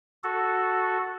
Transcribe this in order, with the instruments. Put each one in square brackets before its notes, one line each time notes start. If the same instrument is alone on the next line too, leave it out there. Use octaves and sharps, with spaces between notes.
[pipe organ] F#4 A4